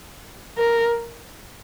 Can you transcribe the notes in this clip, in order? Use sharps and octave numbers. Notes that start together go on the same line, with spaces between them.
A#4